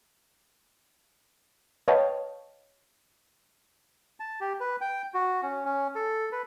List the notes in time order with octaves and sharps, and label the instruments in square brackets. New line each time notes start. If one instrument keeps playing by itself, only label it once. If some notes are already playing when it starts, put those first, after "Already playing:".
[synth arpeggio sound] B4 C#5 D#5 F5 G5 A5
[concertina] A5
G4
B4
G5
F#4
C#4
C#4
A4
B4